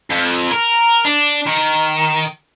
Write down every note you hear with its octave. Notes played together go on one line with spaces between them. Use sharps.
F2
A#4
D4
D#3